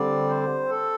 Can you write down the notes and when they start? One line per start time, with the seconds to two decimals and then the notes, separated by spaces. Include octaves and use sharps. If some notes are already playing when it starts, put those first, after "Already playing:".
Already playing: D3 G3 C4 D5
0.29 C5
0.69 A4